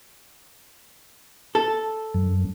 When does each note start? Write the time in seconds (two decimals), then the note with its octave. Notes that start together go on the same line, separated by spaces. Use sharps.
1.55 A4
2.14 F#2